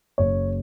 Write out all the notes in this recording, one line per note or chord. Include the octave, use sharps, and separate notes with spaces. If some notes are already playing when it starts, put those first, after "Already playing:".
F#1 C#5